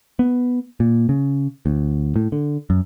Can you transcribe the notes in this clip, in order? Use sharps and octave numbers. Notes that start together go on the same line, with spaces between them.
B3
A#2
C#3
D2
A2
D3
F#2